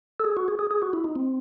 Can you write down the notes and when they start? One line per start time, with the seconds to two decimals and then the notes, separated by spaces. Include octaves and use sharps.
0.20 A4
0.25 G#4
0.37 F#4
0.48 G#4
0.59 G#4
0.71 G#4
0.82 F#4
0.93 E4
1.04 D#4
1.16 C4